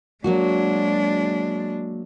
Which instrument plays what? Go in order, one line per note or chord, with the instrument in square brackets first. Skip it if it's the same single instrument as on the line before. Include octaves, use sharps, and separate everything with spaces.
[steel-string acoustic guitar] F#3 A#3 F#4 [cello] G#3 D4